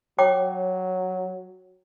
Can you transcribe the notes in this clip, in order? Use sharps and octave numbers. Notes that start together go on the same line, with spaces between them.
F#3 C#5 G5 D6